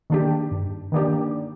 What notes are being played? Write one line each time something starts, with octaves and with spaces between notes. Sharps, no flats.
D#3 A#3 D4 G4
G2
D#3 A#3 D4 G4